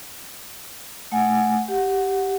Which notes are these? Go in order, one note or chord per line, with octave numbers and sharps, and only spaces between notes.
A3 F#5 G#5
G4 F#5